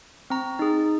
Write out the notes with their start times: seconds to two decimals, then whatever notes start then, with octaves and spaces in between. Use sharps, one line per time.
0.30 C4 A#5
0.59 D#4 G#4